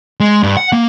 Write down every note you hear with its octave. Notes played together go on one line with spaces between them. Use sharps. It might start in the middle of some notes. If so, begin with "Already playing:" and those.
G#3
G2
F#5
A#3